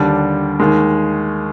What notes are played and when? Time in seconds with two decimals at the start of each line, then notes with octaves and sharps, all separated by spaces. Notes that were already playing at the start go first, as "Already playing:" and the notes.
Already playing: D#2 D3 G3 D4
0.60 D#2 D#3 G#3